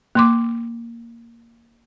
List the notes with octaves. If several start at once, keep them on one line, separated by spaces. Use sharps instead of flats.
A#3 C6 D6